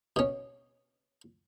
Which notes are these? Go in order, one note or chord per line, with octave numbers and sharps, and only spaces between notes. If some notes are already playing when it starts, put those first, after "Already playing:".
B2 C#4